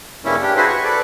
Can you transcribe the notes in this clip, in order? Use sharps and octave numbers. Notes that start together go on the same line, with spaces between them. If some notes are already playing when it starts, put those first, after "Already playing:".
G2 C#3 G3 A#3 C#4 E4
D4 G4
E4 F#4 G#4 B4 C5
C#6
A4 B4 D5